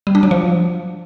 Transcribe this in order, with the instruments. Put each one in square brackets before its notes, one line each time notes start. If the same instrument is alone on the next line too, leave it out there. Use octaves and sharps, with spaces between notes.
[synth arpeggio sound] G3
D4
F#3
F3